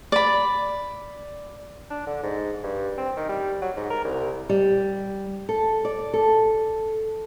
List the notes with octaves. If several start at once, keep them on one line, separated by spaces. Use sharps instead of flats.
D5 B5
D4
D3
G#2
G2
C4
D#3
G3
F#3
G#2
A#4
C2
G3
A4
D5
A4